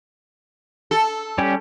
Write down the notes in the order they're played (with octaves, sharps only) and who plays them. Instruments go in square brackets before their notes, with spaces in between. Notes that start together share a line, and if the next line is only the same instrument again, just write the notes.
[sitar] A4
[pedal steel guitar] G3 C#4 G4